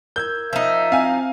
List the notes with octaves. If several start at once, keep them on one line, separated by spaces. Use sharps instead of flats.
A#4 E6 G6 G#6
F3 D#4 E5
C4 F5 G#5